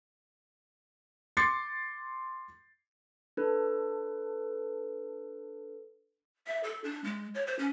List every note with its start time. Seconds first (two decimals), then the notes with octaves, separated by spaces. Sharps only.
1.37 C6 D6 A6 C7 C#7
3.37 D4 A4 B4
6.47 E5
6.64 A4
6.84 D4
7.04 G#3
7.35 C#5
7.47 C5
7.59 C#4